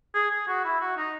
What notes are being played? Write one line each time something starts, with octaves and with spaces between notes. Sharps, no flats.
G#4
G#4
F#4
E4
F#4
D#4